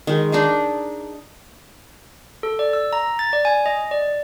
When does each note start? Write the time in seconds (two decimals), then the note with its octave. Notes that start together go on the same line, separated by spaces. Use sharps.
0.07 D#3 G#3
0.32 D4 D#4 G#4 A#5
2.43 A4
2.59 D5
2.73 E6
2.93 A#5
3.19 A6
3.33 D5
3.45 G#5
3.66 D#5
3.91 D5